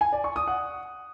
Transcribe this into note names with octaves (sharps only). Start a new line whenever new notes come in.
G#5
D5
C#6
D#6
F#5